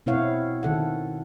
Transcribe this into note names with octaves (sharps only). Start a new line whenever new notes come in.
B2 C4 E4 C#5 F5 F#5
D#3 A4 F#5